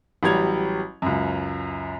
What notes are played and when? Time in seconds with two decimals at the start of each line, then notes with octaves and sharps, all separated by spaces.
0.23 A1 F#3 G3 G#6 F7
1.02 C#2 F#2